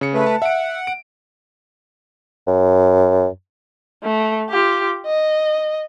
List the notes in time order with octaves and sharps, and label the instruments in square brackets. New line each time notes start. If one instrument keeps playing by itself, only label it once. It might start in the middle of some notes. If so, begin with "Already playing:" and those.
[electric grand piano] C#3 C#7
[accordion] A3 B4
[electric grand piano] A5
[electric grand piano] E5 D7 [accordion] F#5
[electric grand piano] D7
[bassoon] F#2
[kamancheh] A3
F4 G4
D#5